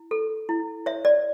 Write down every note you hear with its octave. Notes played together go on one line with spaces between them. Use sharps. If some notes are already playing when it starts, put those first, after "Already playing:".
Already playing: E4
A4
E4
C#5 E5
D5